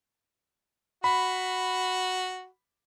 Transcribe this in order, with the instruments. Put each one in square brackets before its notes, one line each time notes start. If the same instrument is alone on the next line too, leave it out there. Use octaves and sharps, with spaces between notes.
[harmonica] F#4 [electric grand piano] B5